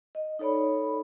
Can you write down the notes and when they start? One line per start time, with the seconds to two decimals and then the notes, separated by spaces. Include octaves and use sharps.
0.15 D#5
0.39 D#4 A4 C#5 D5 B5